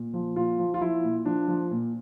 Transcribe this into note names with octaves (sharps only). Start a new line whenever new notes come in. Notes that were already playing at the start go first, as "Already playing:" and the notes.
Already playing: A#2
F3
A#2 F4
F3
F4
F3 E4
A#2
F3 D4
F3
A#2